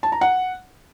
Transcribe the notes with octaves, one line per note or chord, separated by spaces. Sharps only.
A5
A#5
F#5